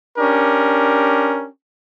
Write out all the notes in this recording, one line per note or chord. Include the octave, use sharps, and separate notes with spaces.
C#4 D4 G4 A#4